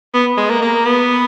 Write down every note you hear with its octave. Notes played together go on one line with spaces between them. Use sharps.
B3
G#3
A#3
A#3
B3